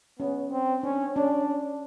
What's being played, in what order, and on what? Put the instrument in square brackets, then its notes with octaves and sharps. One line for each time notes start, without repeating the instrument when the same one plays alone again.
[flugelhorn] B3 [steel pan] C#4
[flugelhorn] C4
[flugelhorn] C#4 [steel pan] D4
[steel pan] C#4 [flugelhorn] D4